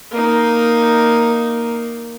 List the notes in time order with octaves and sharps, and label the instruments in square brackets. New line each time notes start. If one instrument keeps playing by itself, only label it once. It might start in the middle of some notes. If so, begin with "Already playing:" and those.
[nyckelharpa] A#3 D#4